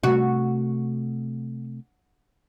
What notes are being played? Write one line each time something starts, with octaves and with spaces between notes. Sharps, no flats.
C3 A3 F#4